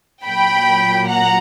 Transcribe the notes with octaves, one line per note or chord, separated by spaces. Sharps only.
A#2 F#3 A#3 G5 B5
F#5 A#5